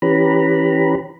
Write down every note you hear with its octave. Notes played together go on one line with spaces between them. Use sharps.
E3 C#4 G4 B4 A#5 B5